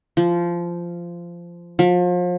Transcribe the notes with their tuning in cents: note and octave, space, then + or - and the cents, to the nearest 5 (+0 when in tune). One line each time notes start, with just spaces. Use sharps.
F3 -15
F3 +35